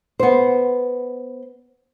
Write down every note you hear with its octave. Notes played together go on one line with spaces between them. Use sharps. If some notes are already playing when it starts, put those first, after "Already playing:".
B3 C5